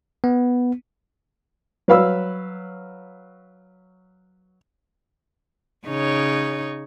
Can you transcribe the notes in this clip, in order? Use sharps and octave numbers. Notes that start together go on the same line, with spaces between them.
B3
F#3 B4 C#5 F5 B5 E6
C#3 D#4 C#5